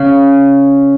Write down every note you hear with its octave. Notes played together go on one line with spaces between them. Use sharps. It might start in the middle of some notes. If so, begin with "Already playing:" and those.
Already playing: C#3